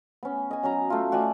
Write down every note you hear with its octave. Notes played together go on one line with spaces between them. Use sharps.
B3 C#4
D#5 G#5
F#3 C#4 A#5
A3 F4
F#4 D5 E5 G#5